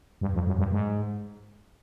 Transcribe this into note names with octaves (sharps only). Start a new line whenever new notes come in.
G2
F2
F#2
G2
G#2